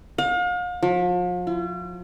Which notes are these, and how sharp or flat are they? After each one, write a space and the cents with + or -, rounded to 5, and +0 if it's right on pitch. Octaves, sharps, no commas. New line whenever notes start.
F5 +40
F3 +40
F4 -45